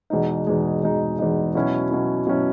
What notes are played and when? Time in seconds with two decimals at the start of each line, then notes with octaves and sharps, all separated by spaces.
0.10 E2 B2 G#3 D#4
0.47 E2 B2 G#3 D#4
0.83 E2 B2 G#3 D#4
1.19 E2 B2 G#3 D#4
1.55 B2 F#3 C#4 E4
1.91 B2 F#3 C#4 E4
2.27 B2 F#3 C#4 E4